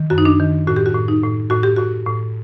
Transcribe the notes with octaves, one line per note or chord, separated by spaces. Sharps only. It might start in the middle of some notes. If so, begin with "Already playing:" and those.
Already playing: D#3
F#2 F#4
D#4
D4
D#3
A2 F#4
G4
F#4
A2
D#4
A2
A2 F#4
G4
A2 F#4
A2